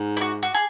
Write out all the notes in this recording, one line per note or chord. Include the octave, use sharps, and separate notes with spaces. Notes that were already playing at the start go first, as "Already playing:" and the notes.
Already playing: G#2
E4
F#4
F#4
G#4